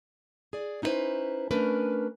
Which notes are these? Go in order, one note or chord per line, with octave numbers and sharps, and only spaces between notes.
G#4 D5
C#4 D#4 E4 F#4 B4 C5
A3 C#4 D4 A#4 B4